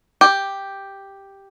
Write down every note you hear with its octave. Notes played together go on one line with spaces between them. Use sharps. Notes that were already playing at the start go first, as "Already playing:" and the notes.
G4